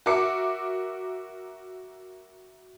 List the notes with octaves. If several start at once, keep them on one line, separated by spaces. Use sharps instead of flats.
F#4 A#4 E5 D6 C#7